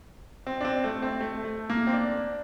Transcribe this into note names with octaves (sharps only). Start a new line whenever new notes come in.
C4
D4
C4
A3
C4
A3
A3
A#3
C4
D4